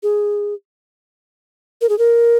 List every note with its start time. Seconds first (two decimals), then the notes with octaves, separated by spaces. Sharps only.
0.03 G#4
1.81 A#4
1.89 G#4
1.98 A#4